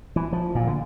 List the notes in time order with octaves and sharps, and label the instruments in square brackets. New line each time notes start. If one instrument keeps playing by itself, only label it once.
[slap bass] E3
F3
A#2
D3